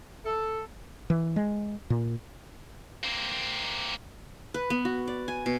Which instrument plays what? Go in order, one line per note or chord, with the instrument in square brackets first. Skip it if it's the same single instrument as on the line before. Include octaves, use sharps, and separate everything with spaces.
[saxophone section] A4
[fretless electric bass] E3
G#3
A#2
[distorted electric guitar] A#3 C4
[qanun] B4
B3
F#4
D5
G#5
B2